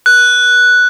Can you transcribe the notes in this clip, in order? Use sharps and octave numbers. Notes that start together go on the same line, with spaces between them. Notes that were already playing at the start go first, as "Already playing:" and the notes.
F#6